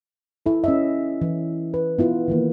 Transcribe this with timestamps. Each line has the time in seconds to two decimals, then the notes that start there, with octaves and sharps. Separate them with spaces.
0.46 E4 A4
0.64 C#4 D#5 E5
1.21 E3
1.74 B4
1.98 B3 E4 F4 B4
2.28 D#3 E3 A#3